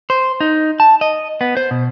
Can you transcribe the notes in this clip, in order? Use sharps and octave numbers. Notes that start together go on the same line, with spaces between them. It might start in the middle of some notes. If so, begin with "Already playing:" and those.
C5
D#4
A5
D#5
B3
C5
B2